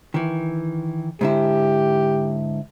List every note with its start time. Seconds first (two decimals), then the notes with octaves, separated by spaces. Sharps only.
0.14 D#3 E3
1.21 G#2 D3 E4 G4